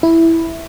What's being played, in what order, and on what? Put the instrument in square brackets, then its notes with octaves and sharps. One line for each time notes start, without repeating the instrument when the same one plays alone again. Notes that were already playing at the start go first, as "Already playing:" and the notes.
[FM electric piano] E4